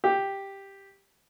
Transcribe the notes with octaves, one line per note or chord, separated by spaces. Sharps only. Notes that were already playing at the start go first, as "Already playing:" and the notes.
G4